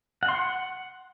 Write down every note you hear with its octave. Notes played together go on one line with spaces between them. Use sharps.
F#5
C6
F#5